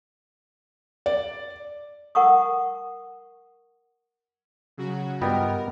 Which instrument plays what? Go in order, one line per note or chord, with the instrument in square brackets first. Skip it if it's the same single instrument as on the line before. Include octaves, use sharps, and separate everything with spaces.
[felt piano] D5
[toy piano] A#4 F#5 A5 C#6 D#6
[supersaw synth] C#3 F#3 F#4
[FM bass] G2 [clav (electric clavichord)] G3 B3 [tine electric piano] F4 D#5 G5 [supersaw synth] A#4